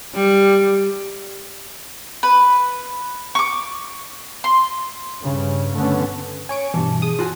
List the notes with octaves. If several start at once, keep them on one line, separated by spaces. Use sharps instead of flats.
G3
B4
C#6 D6
C6
G2 C#3
G2 D3 A3 B3 C#4
C#5 G#5 C#6 D7
G2 B2 E3 A5
G#4 D#6
F4 F#4 G#5